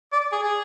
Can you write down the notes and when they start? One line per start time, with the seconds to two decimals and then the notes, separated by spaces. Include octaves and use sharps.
0.13 D5
0.32 G#4
0.42 G#4